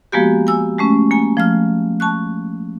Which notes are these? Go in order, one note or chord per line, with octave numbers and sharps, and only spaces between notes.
F3 G#3 A#3 B3 F#4 G4
G#5 E6
G#3 A3 C#4
A#3 G#5
F3 A3 F6
A5 C#6 F#6